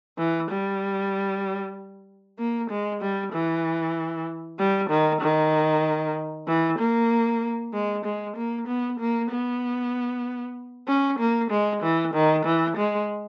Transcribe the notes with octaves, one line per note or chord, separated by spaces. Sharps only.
E3
G3
A#3
G#3
G3
E3
G3
D#3
D#3
E3
A#3
G#3
G#3
A#3
B3
A#3
B3
C#4
A#3
G#3
E3
D#3
E3
G#3